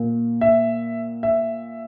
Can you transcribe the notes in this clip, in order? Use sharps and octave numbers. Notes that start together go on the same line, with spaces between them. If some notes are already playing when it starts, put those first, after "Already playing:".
Already playing: A#2
E5
E5